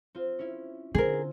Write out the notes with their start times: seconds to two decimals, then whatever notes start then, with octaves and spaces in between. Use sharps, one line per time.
0.15 C4 F4
0.39 C#4 E4
0.95 D3 C4 G#4 A#4 G#5
1.13 F4